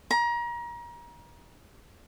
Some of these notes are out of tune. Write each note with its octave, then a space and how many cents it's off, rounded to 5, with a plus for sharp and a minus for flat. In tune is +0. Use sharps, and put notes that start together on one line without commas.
A#5 +30